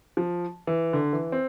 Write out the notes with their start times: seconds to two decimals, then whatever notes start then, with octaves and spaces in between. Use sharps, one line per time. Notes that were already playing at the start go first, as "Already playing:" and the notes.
0.17 F3
0.67 E3
0.93 D3
1.13 E3
1.32 C4